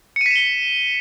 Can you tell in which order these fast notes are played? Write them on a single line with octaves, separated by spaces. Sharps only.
C#7 D#7 B6 E7 G7